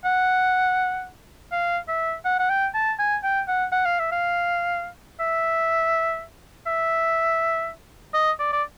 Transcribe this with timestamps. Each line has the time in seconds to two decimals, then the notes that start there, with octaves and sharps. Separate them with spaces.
0.05 F#5
1.52 F5
1.88 E5
2.25 F#5
2.39 F#5
2.50 G5
2.75 A5
2.99 G#5
3.24 G5
3.48 F#5
3.73 F#5
3.86 F5
3.99 E5
4.12 F5
5.20 E5
6.67 E5
8.14 D#5
8.39 D5
8.53 D5